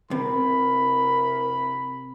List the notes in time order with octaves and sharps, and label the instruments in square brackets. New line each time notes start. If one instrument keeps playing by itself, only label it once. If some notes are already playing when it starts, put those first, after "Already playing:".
[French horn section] D2 E4 A#4 [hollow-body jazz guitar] C3 [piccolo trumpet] B5